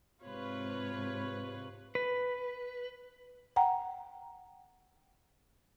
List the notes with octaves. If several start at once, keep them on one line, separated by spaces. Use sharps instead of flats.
G#2 C3 F4 B4 C#5
B4
F#5 G5 A#5